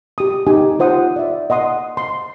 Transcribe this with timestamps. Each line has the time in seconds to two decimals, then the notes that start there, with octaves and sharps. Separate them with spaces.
0.18 G4 D#6
0.47 D#4 G4 G#5
0.80 F4 C5 F#5 D#6
1.16 D5 E5
1.50 D#5 F#5 C6 D#6
1.97 C6